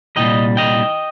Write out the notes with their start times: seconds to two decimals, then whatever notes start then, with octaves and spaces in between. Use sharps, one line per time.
0.16 C2 A#2 G3 D#5 G5
0.57 D#5 G5